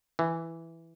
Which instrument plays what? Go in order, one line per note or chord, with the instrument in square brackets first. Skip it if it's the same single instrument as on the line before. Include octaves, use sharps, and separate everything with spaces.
[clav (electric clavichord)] E3